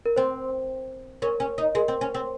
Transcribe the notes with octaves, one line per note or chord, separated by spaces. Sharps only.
A#4
C4 C5
C#4 A#4
C#4
D#4
G#3 A#4
C4
C#4
C4